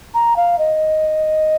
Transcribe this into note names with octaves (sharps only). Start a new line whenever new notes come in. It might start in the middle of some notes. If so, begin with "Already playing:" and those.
A#5
F5
D#5